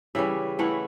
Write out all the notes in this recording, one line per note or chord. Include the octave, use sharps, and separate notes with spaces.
C#3 E3 G3 C#4 E5
E3 A3 C#4 E4 F#5